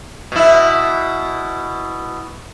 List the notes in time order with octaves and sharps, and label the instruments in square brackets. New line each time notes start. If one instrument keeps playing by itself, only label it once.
[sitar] B2 E4